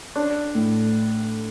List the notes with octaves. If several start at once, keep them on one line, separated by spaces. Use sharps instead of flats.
D4
A2